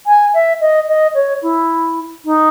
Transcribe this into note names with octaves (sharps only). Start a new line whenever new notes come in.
G#5
E5
D#5
D#5
C#5
E4
D#4